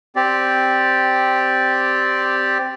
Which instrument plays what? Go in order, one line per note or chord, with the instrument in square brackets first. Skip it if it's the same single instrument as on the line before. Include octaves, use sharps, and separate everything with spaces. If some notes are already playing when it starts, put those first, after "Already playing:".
[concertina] C4 G4 D5